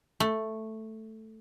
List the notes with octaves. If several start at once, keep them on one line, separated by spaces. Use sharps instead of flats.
A3